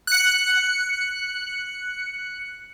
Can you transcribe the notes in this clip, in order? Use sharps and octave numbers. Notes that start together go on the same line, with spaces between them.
F#6 C#7